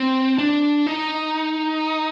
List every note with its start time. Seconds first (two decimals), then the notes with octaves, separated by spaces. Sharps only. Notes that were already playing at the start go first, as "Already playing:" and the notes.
Already playing: C4
0.38 D4
0.87 D#4